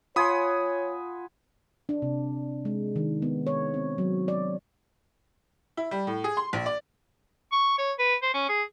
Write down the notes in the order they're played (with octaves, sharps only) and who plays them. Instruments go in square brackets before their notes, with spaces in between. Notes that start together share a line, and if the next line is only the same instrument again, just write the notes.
[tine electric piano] F4 [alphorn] C#5 [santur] F#5 G#5 C6 [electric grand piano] B5 D#6
[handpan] D4
C3
G#3
D#3
B3
C#5
C4
F#3
D5
[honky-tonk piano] E4
G3
A2
G#4
C6
A#1
D5
[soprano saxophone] C#6
C#5
B4
C5
C#4
G#4